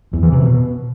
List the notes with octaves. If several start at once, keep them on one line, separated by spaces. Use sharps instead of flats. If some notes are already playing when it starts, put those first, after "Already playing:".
E2
E3
C3
B2